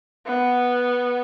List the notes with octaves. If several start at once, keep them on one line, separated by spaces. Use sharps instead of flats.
B3